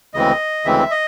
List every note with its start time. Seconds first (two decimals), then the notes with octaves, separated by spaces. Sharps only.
0.14 D2 C#3 E3 G#3 C4 D#5
0.65 D2 C#3 E3 G#3 C4 E5
0.91 D#5